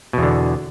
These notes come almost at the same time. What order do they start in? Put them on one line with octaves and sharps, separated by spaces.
B2 E2 D3